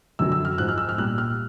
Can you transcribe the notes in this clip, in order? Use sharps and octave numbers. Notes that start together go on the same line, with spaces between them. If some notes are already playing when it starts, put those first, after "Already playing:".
F#2 D3 F#3 E6
E6
F6
G#2 F3 G#3 F#6
F6
E6
F6
A#2 G3 F#6
F6